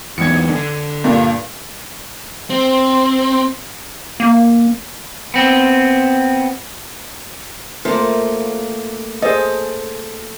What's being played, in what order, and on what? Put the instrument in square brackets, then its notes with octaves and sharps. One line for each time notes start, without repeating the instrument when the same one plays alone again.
[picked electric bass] E2 G#2 [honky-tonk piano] G#6 C#7
[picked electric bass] D3
[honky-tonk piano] G2 A#2
[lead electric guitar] C4
[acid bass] A#3
[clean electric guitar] B3 C4
[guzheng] A3 A#3 [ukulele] F4 C5
[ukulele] G#4 C5 D#5 [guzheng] A4